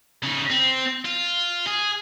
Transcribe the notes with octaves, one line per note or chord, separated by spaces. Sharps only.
C#3 D#4
C4
F4
G#4